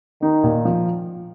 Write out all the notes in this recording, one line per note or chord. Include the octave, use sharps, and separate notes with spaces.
D#3 D#4
A#2
F3